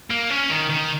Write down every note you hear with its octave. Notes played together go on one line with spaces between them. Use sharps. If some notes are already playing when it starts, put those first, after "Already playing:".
A#3
C#4
D#3
D#3